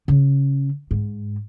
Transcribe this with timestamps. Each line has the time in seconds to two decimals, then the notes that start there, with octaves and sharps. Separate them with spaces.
0.08 C#3
0.91 G#2